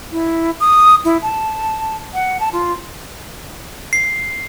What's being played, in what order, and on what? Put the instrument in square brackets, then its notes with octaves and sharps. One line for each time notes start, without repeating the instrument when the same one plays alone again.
[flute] E4
D#6
E4
A5
F#5
A5
F4
[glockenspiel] C7